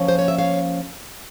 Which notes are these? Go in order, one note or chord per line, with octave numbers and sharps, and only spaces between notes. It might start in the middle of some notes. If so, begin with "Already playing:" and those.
Already playing: F3 A#3 C#4
C5
C#5
E5
C#5 F5